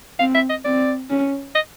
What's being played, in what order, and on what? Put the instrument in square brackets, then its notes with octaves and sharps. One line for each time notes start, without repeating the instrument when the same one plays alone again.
[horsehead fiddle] C4 [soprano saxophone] F5
[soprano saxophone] E5
D#5
[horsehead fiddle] C4 [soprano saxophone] D5
[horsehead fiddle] C#4
[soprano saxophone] D#5